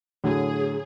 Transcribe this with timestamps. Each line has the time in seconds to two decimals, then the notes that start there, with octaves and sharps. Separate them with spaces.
0.24 A2 D3 F#3 G#4